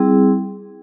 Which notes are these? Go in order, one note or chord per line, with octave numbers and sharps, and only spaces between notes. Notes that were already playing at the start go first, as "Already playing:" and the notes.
Already playing: G3 C4 E4 G#4